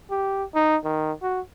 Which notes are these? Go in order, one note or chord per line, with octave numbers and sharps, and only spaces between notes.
G4
D#4
D#3
F#4